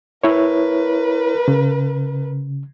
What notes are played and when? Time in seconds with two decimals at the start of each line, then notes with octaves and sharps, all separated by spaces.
0.24 E4 A#4 B4 C#5
1.48 C#3